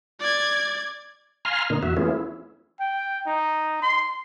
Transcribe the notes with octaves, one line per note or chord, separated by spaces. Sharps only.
D5 G#6
F5 G#5 A#5 C6 F6
A#2 D3 A#3 D#4
E2 F#4 E5
E3 A3 B3 C#4 F4 G#4
E4
G5
D#4
C6